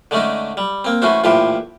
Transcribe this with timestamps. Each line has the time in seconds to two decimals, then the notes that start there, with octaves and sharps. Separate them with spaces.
0.11 D3 G#3 A3 C#4 D#4
0.57 G3
0.85 A#3 C4
1.02 E3 A3 C#4 F#4 C5
1.24 A#1 A2 E3 F3 G4 C5